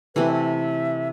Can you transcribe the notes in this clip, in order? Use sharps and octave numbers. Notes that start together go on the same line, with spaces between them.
C3 E3 A3 E4 B4
E5